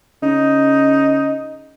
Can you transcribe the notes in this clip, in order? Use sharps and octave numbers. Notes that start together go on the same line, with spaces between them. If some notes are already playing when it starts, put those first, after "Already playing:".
C#3 D#4